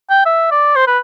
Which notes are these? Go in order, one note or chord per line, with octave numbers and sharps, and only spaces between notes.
G5
E5
D5
C5
B4